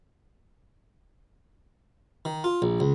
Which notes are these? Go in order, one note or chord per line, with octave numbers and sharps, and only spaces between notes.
D#3
F4
A#1
C#2